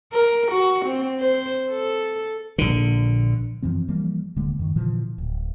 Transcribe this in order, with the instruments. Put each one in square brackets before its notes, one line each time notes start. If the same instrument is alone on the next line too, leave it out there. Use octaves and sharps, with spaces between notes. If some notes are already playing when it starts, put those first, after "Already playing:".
[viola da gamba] A#4
F#4
C4
C5
A4
[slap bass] A#1 D3
[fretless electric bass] F#2 E3 F3 C4
E3 F3 G3 A#3
D1 D3 G#3 A#3
F#2 D#3
A#2 D3 E3 F3
D1